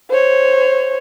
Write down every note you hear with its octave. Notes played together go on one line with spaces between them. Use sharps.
C5 C#5